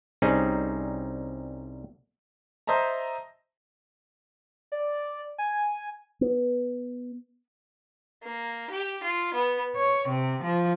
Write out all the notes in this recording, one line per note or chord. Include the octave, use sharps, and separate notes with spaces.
C2 G3 C4 C#4 D#4 G#4
C5 D#5 E5 A5 A#5
D5
G#5
B3
A#3
G4
F4
B3
C#5
C3
F3